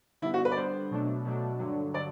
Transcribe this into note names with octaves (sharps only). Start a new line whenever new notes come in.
D3 G3 B3 E4
F#4
B4
D5
D3 G3 B3 C5
B2 F#3 A3 D4
B2 F#3 A3 D4
G2 D3 F#3
D3 F#3 D5